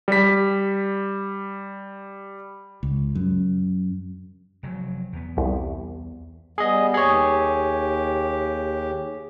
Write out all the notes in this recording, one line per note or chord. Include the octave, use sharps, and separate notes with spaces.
G3 B6
C#2
F#2
F1 F#3
E2 B3
C2
G3 B3 G#4 D#5
D#2 G4 G#4 C#5